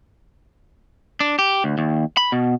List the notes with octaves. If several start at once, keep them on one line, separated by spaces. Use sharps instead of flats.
D4
G4
D2
D#2
B5
B2